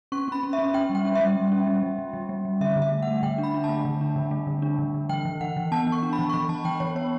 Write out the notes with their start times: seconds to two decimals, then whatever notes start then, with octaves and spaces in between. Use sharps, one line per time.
0.12 C#4 C#6
0.28 C#4 B5
0.43 C#4
0.53 E5
0.58 C#4
0.74 C#4 G5
0.90 G3
0.95 G5
1.05 C#4
1.15 E5
1.21 G3
1.36 G3
1.52 C#4
1.67 G3
1.83 G3
1.99 G3
2.13 G3
2.29 G3
2.45 G3
2.61 D3 E5
2.76 D3
2.82 E5
2.92 A3
3.02 A3 F#5
3.23 D3 G5
3.38 D4
3.43 B5
3.54 D4
3.64 A5
3.69 A3
3.85 D3
4.01 D4
4.16 D3
4.31 A3
4.47 D3
4.62 D4
4.79 D3
4.94 D3
5.09 E3 G5
5.25 E3
5.41 E3 F#5
5.57 E3
5.72 B3 A5
5.87 E3
5.92 C#6
6.03 D4
6.13 B5
6.19 E3
6.29 C#6
6.33 E3 B5
6.49 E3 A5
6.65 E3 G5
6.80 E3 C#5
6.95 B3 C#5